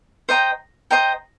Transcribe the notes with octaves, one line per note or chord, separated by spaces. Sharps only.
C5 D#5 G5 A#5
C5 D#5 G5 A#5